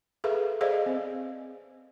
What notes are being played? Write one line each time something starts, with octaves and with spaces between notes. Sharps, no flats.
G#4 A4 B4 E5 F5
G#4 C5 D5 D#5 F5
C4